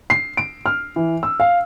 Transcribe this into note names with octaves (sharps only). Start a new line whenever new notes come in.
C7
D7
F6
E3
E6
F5